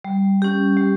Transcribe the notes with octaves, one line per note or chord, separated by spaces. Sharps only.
G3
C#4 G4
G3